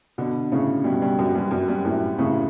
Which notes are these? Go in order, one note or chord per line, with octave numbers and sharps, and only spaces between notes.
B2 D3
A2 C#3
G2 B2
G2
F#2
G2
F#2
G2
F#2 A2
A2 C#3